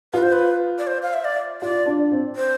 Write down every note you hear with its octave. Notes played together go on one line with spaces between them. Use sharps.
F4 B4
C5
B4
D5
C5
F5
E5
D5
F4 D5
D4
C4
C5